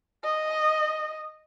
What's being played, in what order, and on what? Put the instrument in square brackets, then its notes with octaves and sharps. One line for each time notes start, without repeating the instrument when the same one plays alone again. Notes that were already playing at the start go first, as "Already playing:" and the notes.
[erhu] D#5